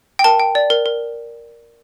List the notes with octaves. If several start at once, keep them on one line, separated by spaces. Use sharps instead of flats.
G5
A#4 A5
G5
D5
A#4
A#4